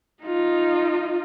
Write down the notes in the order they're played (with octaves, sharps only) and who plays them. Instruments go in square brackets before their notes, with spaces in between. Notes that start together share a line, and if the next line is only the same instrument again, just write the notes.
[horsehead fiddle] D#4 F4